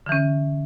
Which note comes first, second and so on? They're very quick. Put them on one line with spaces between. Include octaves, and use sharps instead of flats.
D3 E3 C#4